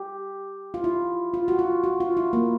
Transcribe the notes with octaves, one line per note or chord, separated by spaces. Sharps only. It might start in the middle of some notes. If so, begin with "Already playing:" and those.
Already playing: G4
F4
E4
F4
F#4
F4
F#4
F4
E4
A#3